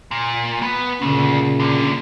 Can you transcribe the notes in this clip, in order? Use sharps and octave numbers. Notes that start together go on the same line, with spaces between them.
A#2
B3
D2 A#2 C#3
C2 D3